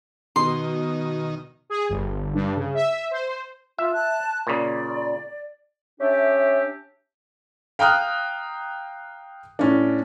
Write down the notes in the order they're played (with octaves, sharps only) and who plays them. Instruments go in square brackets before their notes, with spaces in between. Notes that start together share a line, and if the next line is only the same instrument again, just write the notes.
[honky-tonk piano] B2 [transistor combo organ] D#3 [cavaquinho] C6
[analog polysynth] G#4
G1
G2
C#3
E5
C5
[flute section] F4 [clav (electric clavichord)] E5
[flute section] A5 F#6
[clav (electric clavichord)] A#2 C#3 [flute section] D5
[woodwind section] C#4 D4 G4 E5
[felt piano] F5 G5 A#5 D#6 F6 F#6
A2 C#4 D4